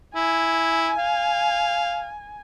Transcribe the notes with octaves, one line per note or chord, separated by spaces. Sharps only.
E4 G#5
F5